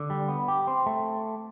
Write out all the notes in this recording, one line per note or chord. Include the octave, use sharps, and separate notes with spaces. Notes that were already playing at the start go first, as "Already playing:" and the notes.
Already playing: D3
G3
B3
G4
C4
A3